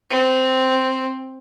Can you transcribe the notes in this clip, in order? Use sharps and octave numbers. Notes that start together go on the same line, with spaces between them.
C4